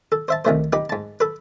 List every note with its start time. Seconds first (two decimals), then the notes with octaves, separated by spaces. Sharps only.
0.12 A4
0.28 C5 E5 A5
0.45 C2 D#3 A3 C5
0.73 D#4 G4 B4
0.90 G#2 A5
1.20 A4 B4